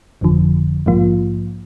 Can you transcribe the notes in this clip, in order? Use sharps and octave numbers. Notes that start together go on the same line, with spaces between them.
G1 F2 D3 F3
A#1 G#2 F3 A#3 F4